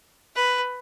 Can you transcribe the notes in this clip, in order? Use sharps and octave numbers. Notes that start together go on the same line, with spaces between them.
B4